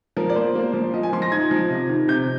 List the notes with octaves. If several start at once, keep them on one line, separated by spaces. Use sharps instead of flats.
F3 A#4
D5
A#3 C5
A#3
F3
F3 D#5
G#5
F3 C6
A#6
D#4 G#6
F3
C3
D#3
C3 G6